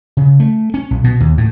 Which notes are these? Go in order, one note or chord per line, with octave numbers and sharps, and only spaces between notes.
C#3
A3
C#4
B1
B2
D#2
A2